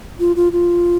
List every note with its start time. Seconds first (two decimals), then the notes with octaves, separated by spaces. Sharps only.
0.20 F4
0.36 F4
0.52 F4